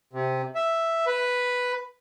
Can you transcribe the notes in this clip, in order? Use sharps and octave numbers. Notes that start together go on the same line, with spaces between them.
C3
E5
B4